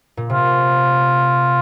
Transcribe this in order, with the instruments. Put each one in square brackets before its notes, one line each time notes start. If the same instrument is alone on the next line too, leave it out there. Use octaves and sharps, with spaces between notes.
[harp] A#2
[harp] C3 [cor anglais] F4